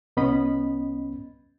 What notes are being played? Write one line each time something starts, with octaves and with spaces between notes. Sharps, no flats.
C2 B3 C#4 D#5 B5